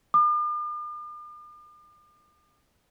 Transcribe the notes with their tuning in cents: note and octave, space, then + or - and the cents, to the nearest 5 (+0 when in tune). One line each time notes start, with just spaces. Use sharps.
D6 +45